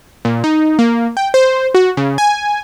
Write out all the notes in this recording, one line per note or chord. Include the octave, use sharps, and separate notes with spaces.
A#2
D#4
A#3
G5
C5
F#4
C#3
G#5